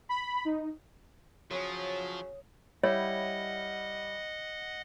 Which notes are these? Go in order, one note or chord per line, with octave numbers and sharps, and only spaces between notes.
B5
D#4
C#3 F3 F#3 C#5 D#6
G3 E4 C#5 D#5 F#5